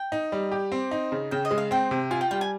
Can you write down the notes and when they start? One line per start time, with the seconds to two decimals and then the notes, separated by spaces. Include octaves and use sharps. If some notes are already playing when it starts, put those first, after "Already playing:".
Already playing: G5
0.12 D#4
0.32 G3
0.52 G4
0.72 C4
0.91 D#4
1.12 C#3
1.31 C#3 G5
1.45 D#5
1.51 G#3
1.58 F5
1.71 C4 G5
1.91 C3
2.11 F4 G#5
2.21 G5
2.31 G3 G5
2.41 G#5